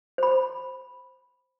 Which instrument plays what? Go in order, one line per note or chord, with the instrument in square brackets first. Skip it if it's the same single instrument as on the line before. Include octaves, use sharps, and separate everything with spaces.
[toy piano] C5 B5